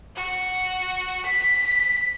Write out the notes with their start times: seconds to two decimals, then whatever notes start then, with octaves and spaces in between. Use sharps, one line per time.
0.16 F#4
1.26 B6